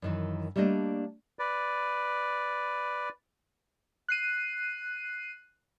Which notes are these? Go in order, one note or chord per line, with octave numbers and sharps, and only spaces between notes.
F#2 D#3 E3
G3 A3 A#3 D4 D#5
B4 D5
F#6 C7 D#7